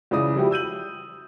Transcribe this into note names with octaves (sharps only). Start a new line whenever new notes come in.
C#2 C#3 E3 D5 D#6
F3 G3 E4 F#4 G4
E6 G6 D#7 F#7